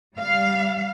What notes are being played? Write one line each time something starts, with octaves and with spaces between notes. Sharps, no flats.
G3 F5